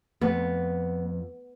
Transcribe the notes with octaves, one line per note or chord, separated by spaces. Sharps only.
F2 B3